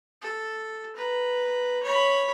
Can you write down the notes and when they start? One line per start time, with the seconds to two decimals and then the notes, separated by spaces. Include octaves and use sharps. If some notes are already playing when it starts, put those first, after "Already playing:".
0.21 A4
0.96 B4 A#5
1.83 C#5 B5